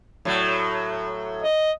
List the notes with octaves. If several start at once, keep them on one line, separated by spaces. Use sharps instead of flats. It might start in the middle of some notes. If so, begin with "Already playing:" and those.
A2 F#3
D#5